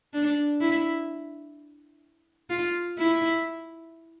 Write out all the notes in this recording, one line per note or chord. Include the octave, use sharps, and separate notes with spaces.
D4
E4
F4
E4